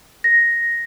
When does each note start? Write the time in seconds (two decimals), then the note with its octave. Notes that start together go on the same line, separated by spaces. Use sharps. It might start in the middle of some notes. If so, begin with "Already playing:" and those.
0.24 A#6